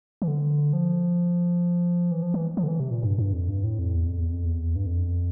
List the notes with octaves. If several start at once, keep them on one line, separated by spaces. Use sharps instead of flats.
E3
D3
F3
E3
F3
E3
F3
D3
E3
C3
A#2
G2
G2
F2
G2
A2
F2
E2
F2
E2
F2
E2
G2
F2